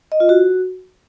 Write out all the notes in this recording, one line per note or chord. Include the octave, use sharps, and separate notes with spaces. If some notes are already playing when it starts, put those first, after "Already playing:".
D#5
F4
F#4